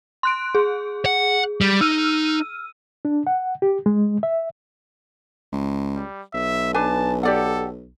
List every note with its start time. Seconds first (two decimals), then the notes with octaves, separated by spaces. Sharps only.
0.23 C6 F#6 D7
0.55 G#4
1.06 F#5
1.61 G3
1.81 D#4 E6 F6 D#7
3.05 D4
3.27 F#5
3.62 G4
3.86 G#3
4.23 E5
5.53 C#2
5.96 G3
6.34 B1 E5
6.74 D4 B4 G#5 A5
7.23 G4 A4 D5 F#5